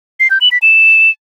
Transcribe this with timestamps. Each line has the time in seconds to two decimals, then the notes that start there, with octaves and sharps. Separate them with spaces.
0.20 C7
0.30 G6
0.41 F#7
0.52 B6
0.62 E7